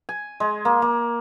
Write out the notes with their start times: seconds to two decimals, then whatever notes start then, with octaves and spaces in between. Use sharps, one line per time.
0.09 G#5
0.40 G#3
0.65 A#3
0.82 A#3